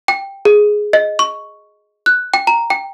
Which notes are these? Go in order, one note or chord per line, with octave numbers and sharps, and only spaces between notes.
G5
G#4
D#5
C#6
F#6
G5
A#5
G5